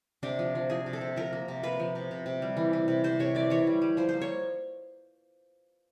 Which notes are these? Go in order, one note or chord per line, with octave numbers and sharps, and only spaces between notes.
C3 D4
F3
F3
F3 G#4
C3
A4
C3
F3 A#4
A#3
C3
A#3 B4
F3
C3
C3
C3
G3
E3
E3
C3
C3 C5
C3 C#5
E3 D5
E3 C#5
G3
G3
F3 C5
A#3 C5
C#5